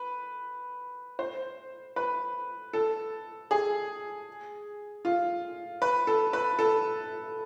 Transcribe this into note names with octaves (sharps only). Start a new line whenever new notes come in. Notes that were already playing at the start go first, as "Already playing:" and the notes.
Already playing: B4
C5
B4
A4
G#4
F4
B4
A4
B4
A4